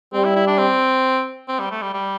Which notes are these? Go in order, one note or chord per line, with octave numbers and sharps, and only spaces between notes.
G3 C4
E4
E4
D4
C4
C4
G3
A3
G3
G3